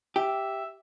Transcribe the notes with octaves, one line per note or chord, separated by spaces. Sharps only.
G4 E5